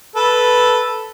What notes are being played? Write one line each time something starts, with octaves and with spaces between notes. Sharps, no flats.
A4 B4